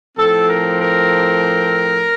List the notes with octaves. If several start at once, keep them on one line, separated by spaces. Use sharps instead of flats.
A2 F3 C4 A4
A#4
A#4